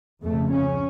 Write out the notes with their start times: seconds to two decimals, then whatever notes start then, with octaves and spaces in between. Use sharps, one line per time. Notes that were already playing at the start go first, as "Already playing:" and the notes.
0.22 F2 C#3 A3
0.51 C#4